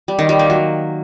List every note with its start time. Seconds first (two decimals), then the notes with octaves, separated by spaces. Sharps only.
0.08 G3
0.19 D#3
0.29 G3
0.39 A#3
0.50 F#3